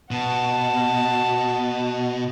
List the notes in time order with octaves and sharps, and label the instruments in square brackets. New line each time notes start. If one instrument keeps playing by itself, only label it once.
[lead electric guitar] B2 [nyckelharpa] F#5 A5